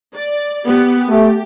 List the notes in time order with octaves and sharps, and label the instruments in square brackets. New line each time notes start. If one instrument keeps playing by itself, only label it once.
[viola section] D5
B3 G4
[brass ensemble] A3 [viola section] G4